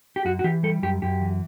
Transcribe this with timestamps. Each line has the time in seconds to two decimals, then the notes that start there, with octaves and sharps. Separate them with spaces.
0.16 G4
0.25 F#2 F#4
0.39 F#4
0.44 E3 G4
0.63 G3 A4
0.82 F#2 G4
1.02 F#2 G4
1.21 E3